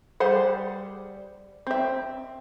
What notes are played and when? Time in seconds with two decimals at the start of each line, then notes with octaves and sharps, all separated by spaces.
0.20 G3 G#4 C5 F#5
1.67 C4 E5